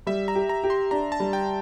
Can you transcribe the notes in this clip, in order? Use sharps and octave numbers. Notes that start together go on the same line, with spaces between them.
G3 E5
A#5
G4
A#5
G4
C6
D4 A#5
A5
G3
G5